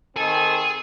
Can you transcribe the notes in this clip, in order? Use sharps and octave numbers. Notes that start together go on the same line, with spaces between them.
D#3 C4 G#4 A4 G#5